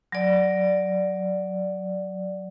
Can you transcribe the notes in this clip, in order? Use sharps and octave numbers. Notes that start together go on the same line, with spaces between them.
F#3 D5